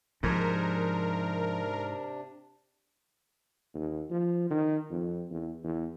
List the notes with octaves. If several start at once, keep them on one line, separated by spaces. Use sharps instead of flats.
G#2 C3 F3 D4 A#4
D#2
F3
D#3
F2
E2
E2